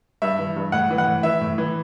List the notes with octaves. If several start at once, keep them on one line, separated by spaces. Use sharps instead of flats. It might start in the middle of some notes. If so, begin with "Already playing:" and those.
G2 E5
E3
G2
A2 F#5
E3
F#5
A2
E3 E5
A2
E3